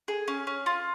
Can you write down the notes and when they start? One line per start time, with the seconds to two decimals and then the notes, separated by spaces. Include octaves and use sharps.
0.08 G#4
0.28 C#4
0.47 C#4
0.66 F4